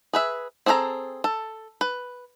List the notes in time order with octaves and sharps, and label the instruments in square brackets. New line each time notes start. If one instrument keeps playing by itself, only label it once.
[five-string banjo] G#4 B4 E5
C4 G#4 A4 B4 A#5
A4
B4